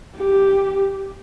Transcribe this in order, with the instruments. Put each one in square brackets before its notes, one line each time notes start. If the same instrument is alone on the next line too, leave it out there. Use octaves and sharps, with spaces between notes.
[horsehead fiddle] G4